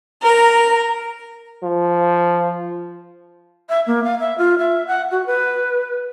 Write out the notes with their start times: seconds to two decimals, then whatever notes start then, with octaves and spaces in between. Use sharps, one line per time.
0.23 A#4 A#5
1.63 F3
3.69 E5
3.87 A#3
4.04 F5
4.20 E5
4.38 F4
4.59 E5
4.87 F#5
5.11 F#4
5.26 B4